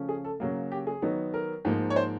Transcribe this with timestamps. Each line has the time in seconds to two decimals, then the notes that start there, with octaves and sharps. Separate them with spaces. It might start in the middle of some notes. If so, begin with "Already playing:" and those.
Already playing: C#3 F3 A3 C#4
0.09 G#4
0.24 A4
0.40 C#3 F#3 A#3
0.72 G4
0.87 G#4
1.02 D#3 F#3 B3 D#4
1.34 A#4
1.65 G#2 F3 A#3
1.90 C#5
1.96 C5